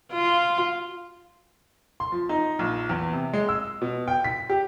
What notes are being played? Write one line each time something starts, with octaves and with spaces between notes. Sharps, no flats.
F4
C6
F3
D#4
A#1
E2
C3
G#3
E6
B2
G5
B6
G4